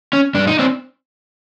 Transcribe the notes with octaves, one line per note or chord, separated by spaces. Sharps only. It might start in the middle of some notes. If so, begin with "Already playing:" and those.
C#4
G2 D4
D#4
C4 D4